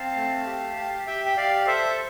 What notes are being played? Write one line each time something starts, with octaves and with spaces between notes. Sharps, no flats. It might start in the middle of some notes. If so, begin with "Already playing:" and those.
Already playing: C4 F5 A5
A3
G4
G4
G4 E5 G5
G5
G4 D5 F5
A4 C5 E5
A5